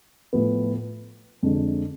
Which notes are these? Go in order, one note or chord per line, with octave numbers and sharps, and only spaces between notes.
A2 F3 B3
F2 D3 G#3